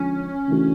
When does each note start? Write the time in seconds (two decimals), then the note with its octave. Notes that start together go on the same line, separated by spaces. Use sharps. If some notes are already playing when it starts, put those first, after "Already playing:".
Already playing: D3 F3 G#3 C#4
0.48 C#3 E3 A3 D4 F#4